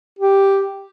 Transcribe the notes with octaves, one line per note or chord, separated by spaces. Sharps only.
G4